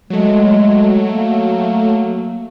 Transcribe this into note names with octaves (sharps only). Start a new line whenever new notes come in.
F#3 G#3 A3
A#3